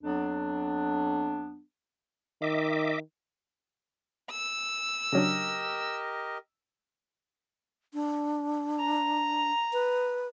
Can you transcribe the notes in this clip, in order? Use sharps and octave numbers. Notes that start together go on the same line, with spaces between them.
F2 F#3 B3 D4
D#3 D#5 E5 D6
E6
C#3 F#3 D4 G4 A#4 D#5
D4
A#5
B4